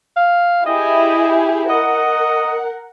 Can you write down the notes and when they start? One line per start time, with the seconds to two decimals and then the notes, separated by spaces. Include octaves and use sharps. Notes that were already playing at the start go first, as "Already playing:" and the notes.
0.16 F5
0.66 E4 G4 G#4 D#5
1.70 A#4 D#5 F#5